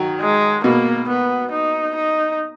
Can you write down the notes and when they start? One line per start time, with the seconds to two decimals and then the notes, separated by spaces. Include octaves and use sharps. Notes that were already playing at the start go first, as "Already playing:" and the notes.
Already playing: D#3 F#3
0.21 G#3
0.64 B2 A#3
1.09 B3
1.51 D#4
1.96 D#4